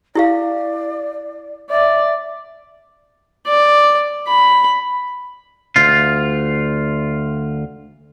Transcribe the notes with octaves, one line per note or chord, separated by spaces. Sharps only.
E4 G4 D5 F5
D5 E5
D5
B5
D2 F4